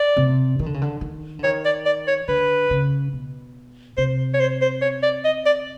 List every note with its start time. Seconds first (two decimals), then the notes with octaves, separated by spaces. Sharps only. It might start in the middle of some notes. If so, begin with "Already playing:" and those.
Already playing: D5
0.17 C3
0.59 D#3
0.66 D3
0.74 C#3
0.81 D3
1.01 D#3
1.39 D3
1.44 D#3 C#5
1.65 D5
1.85 D5
2.08 C#5
2.28 D3 B4
2.70 C#3
3.13 B2
3.97 C3 C5
4.34 C#5
4.40 C5
4.61 C5
4.82 C#5
5.03 D5
5.25 D#5
5.46 D5